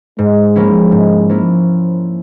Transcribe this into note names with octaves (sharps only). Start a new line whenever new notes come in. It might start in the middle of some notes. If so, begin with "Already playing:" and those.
G#2 G#3
F3 A#3 C#4 E4
G#2
F3 A#3 C#4 E4